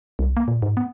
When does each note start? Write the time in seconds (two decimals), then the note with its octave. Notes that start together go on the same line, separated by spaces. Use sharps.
0.19 C2
0.37 A#3
0.48 A#2
0.62 G#2
0.77 B3